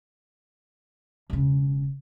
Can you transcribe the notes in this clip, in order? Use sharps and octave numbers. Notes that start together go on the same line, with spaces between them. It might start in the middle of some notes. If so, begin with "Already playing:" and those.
E1 C#3